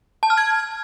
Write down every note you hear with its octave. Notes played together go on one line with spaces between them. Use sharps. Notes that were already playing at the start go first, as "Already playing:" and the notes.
A5
F6
G#6